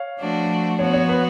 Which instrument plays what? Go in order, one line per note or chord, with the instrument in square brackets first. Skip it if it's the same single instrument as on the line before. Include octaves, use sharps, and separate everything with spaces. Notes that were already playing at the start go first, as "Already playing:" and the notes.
Already playing: [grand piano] C#5 F5
[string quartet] F3 A3 D4 F#4
[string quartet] F3 B3 F#4 [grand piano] C#5
[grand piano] C#5
B4